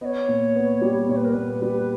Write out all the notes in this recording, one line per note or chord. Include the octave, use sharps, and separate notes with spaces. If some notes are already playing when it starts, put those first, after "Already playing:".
B3 C#5 D#5
A#2
B3
G3
A#2 C#5
B4
A#4
A#2 B4
G3